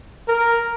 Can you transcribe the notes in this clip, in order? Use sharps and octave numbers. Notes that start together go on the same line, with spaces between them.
A#4